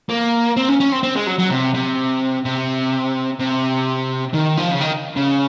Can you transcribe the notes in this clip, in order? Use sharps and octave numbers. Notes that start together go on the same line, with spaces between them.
A#3
C4
C#4
C#4
C4
C4
G#3
F#3
F#3
C3
C3
C3
C3
D#3
F3
C#3
D#3
C#3